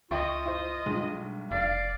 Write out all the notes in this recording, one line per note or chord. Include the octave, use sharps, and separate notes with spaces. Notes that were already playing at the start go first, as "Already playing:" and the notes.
C#2 F4 D#5 E5 G5 C#6
E4 C5
B1 G2 G#3
F1 D5 F5